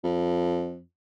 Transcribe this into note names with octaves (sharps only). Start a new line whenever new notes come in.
F2